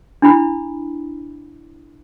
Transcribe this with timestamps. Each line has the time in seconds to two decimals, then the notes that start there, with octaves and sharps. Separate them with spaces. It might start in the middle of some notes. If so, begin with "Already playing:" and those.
0.22 D4 E4 B5